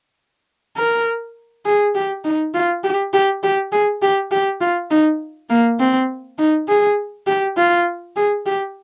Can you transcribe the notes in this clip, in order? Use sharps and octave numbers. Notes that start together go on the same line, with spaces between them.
A#4
G#4
G4
D#4
F4
G4
G4
G4
G#4
G4
G4
F4
D#4
A#3
C4
D#4
G#4
G4
F4
G#4
G4